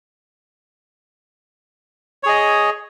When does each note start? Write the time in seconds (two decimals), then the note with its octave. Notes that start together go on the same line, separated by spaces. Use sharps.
2.23 C#5
2.26 G#4
2.29 D#5